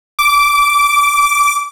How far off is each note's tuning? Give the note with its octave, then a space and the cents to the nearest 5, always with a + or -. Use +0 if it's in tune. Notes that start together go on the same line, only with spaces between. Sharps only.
D6 -10